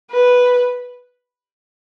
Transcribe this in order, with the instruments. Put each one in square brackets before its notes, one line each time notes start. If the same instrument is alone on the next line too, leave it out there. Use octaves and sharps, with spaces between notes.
[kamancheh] B4